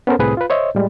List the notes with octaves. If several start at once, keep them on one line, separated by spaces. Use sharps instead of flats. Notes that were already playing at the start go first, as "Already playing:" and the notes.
B3 C#4 A4 A#4 C5
C2 A2 C4 G#4 B4 D#6
F4 B4
C5 C#5 D#5 E5
A2 G3 G#3